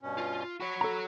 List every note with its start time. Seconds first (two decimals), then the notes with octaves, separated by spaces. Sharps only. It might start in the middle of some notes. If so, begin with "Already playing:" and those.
0.01 G2 B2 C#4
0.18 F4
0.60 F#4 C#5 B5 C#6
0.81 A4 A#5